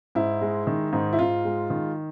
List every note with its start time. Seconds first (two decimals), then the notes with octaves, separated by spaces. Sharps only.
0.15 G#2 E4
0.41 G#3
0.67 D#3
0.93 G#2
1.13 E4
1.19 G#2 F4
1.45 G#3
1.70 D#3